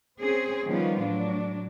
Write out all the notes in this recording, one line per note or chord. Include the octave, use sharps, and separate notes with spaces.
C4 C#4 G#4 C5
D#3 F3 G3 B3 C#4 F4
A2 F#3 D4